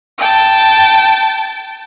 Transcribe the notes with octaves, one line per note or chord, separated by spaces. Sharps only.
G5 A5